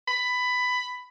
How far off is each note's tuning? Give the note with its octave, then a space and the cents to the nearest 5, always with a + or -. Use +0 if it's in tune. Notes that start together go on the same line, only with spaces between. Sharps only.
B5 +15